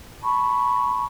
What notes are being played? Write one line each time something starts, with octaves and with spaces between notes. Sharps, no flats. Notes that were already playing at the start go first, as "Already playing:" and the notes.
A5 B5 C#6